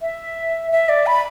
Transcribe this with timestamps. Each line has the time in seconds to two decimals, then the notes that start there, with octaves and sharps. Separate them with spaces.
0.02 E5
0.72 E5
0.89 D5
1.06 B5